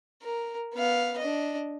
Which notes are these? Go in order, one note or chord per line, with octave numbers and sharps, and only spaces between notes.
A#4
B3 F5
D4 D#5